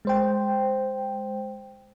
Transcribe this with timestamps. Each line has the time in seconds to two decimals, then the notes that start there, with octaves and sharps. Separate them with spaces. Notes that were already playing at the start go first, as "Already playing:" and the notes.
0.05 G#3 C5 G5